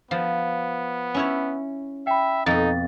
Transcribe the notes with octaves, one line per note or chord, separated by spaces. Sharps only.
F3 B3
C#4 E4 C#5
E5 G5 B5
F2 B2 D#4 A6